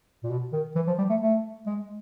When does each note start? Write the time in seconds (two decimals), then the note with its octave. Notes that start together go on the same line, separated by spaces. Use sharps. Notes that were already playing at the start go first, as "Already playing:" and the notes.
0.23 A#2
0.30 B2
0.53 D#3
0.76 E3
0.87 F3
0.98 G3
1.10 A3
1.21 A3
1.66 G#3